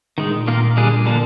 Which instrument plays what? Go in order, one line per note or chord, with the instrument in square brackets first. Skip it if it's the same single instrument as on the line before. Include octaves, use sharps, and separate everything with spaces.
[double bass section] A#2 [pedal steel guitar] D#3 G#3 D#4
[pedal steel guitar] D#3 A#3 F4 A#4
D3 G3 A#3 D4 G#4
D3 F3 A#3 D4